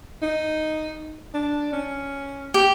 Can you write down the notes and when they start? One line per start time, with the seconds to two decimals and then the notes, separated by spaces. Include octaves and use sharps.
0.22 D#4
1.34 D4
1.73 C#4
2.54 G4